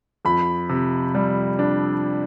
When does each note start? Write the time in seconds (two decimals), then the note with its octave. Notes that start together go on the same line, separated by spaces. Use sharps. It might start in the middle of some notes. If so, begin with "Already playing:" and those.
0.25 F2 B5
0.69 C3
1.15 G3
1.59 D4